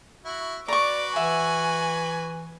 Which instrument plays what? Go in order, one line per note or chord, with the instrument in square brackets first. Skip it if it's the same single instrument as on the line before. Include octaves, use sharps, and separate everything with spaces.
[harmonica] E4 F#4
[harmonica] F#4 B4 [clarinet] D5 [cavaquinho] A#5 C#6 [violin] D6
[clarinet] E3 [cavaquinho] E5 F#5 [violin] G#5